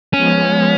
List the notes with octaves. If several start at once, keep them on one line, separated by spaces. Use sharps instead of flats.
F3 G#3 B3 C#4